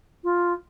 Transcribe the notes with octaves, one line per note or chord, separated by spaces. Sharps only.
F4